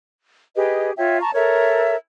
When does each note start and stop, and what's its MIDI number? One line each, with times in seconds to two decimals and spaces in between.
0.56 0.92 67
0.56 0.92 68
0.56 0.92 71
0.56 0.92 75
0.97 1.20 65
0.97 1.20 73
0.97 1.20 76
0.97 1.20 79
1.21 1.30 81
1.21 1.30 82
1.21 1.30 85
1.34 1.95 69
1.34 1.95 70
1.34 1.95 73
1.34 1.95 76